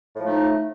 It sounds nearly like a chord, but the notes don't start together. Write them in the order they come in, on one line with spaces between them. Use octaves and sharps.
A2 F3 A3 D#4